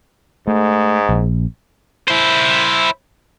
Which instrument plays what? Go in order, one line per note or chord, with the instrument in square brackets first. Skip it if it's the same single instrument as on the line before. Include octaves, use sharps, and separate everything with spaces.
[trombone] G#2 [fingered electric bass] A3
[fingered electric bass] A#1
[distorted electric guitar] E4 C5